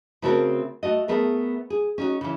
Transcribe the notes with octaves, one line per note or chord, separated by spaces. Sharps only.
C#3 A3 C4 F#4 A4 A#4
A3 F#4 D#5
A3 B3 G#4 A#4
G#4
C#4 D#4 F#4
C#3 E3